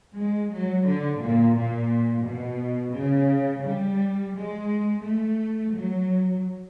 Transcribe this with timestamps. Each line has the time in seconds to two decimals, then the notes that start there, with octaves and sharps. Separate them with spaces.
0.17 G#3
0.51 F#3
0.85 D3
1.20 A#2
1.55 A#2
2.25 B2
2.94 C#3
3.63 G3
4.34 G#3
5.03 A3
5.72 F#3